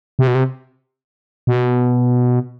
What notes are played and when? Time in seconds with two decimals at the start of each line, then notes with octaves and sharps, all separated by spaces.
0.19 C3
0.27 B2
0.35 C3
1.47 B2